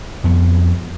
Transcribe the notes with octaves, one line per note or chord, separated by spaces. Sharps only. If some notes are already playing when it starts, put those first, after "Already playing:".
F2 B3